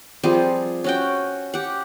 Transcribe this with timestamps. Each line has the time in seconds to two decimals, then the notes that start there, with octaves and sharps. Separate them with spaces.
0.23 F3 G3 C4 G#4
0.84 C#4 F#4 G5
1.54 G4 F#5